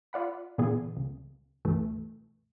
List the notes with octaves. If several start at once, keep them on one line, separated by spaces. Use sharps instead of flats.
F4 D5 F#5 B5
A#2 D3 E3 B3 G#4
C#2
C#2 G2 B2 E3 A3